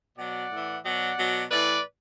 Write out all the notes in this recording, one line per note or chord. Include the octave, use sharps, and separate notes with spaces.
B2 F#3 D5 F#5
A2 E3
B2 F#3 D5 F#5
B2 F#3
A2 E3 B4 D5